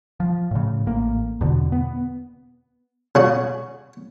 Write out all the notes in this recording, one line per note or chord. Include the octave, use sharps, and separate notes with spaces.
F3
A2 C#3
A1 A#3
E2 B2 D3
B3
C#3 F#4